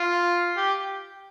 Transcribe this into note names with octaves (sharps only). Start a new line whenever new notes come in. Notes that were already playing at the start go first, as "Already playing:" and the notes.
Already playing: F4
G4